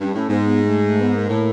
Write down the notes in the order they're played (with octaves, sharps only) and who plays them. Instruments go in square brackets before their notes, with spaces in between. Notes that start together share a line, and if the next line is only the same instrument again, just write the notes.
[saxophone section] G2 [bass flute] C#4
[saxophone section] A2 [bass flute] C#4
[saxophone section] G#2 [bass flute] B3
[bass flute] B3
A3
A3
B3
A#3
[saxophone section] A2